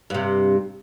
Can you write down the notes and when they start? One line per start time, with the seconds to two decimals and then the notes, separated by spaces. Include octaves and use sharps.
0.10 G2 C3